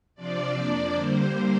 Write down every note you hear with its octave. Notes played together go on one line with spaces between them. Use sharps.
C3 F3 D4 F4 D5
F2 F3 A#3 D4
D3 G3 A#3 C5